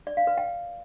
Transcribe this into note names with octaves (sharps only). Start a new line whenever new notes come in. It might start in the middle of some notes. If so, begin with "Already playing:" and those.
D5
F5
B4
G5